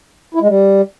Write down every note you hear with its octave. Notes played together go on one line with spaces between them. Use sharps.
E4
G#3
G3